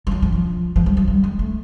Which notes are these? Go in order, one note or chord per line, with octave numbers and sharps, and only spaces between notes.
F3
F#3
F3
F3
F3
G3
F#3
G3
G#3
A3